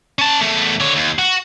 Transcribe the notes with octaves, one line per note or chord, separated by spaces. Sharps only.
C#4 A5
E2 A3
D3 C#5
D#2
F#4